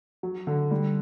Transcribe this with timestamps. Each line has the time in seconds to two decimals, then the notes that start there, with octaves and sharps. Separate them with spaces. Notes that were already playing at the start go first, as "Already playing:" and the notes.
0.23 F#3
0.47 D3
0.71 G3